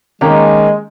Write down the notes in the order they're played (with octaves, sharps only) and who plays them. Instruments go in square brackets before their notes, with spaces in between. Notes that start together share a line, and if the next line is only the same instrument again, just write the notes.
[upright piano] D#3 A#3 C#4 G4 [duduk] G#3